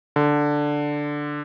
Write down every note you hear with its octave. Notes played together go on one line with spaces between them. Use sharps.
D3